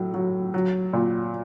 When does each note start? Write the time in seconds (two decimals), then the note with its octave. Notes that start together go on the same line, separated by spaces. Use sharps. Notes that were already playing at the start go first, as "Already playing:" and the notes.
Already playing: A2 F#3
0.14 F#3
0.54 F#3
0.93 A#2